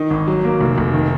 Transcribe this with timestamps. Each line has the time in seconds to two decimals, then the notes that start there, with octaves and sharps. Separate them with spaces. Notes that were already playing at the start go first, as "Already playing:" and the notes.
Already playing: D#3 D#4
0.11 G#1
0.27 F#3
0.44 A#3
0.61 F1
0.78 F1
0.94 D#3